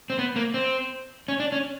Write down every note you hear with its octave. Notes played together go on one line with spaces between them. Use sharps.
C4
B3
A#3
C4
C#4
D4
C#4